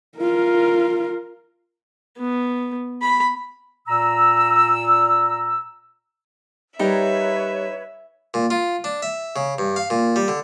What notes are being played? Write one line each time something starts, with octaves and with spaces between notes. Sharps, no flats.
F4 A#4
B3
B5
A#2 A#5 E6
G3 D#4 A#4 B4 C#5 E5
A#2
F4
D4
E5
C#3
G2
F5
A#2
G3
D3